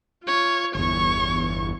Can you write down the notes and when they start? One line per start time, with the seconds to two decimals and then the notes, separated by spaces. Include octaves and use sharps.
0.24 F4 C#5
0.75 G1 E2 C#5 C#6